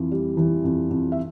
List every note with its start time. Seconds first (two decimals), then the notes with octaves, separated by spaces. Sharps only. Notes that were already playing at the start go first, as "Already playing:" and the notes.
Already playing: F2 E3
0.11 G3
0.37 E3
0.64 F2
0.90 F2
1.12 E5